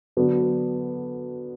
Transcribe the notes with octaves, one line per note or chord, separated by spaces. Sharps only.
D3 F#3 B3 D4 F#4